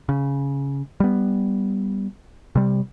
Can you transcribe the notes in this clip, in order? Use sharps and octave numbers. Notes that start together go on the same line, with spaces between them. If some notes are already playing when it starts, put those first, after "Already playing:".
C#3
G3 B3
C3 G3